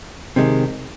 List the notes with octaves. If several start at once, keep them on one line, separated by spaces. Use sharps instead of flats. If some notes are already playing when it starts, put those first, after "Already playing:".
C3 D#3 G#3